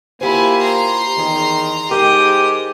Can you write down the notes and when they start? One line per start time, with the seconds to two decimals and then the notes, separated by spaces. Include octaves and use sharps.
0.21 A#3 E4 F4 G4 C5 G#5
0.62 A#5 C6
1.17 E2 D#3 G#4
1.91 G#2 G4 A#4 D#5 G5